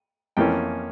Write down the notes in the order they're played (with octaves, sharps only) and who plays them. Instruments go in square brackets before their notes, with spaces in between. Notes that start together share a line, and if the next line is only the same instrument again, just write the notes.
[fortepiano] F2 E3 A#3 C#4 G5